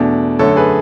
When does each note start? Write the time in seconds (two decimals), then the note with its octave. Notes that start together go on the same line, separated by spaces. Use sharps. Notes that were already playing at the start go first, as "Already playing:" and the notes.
Already playing: E2 B2 A3 D4
0.39 F#2 D3 A3 A4 C#5
0.56 G#4 B4